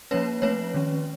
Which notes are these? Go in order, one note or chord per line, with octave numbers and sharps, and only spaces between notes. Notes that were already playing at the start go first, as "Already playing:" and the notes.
F3 A#3 C#4 B4 C#5
F3 A3 C4 B4 C#5
D#3 G#3 C#4